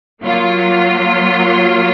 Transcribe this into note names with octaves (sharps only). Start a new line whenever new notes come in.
F#3 A#3 F4